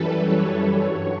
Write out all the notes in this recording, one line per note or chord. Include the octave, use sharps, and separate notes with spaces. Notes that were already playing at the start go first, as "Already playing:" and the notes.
Already playing: F#2 E3 G3 A4 B4
C#5
B4
G2 F#3 C#5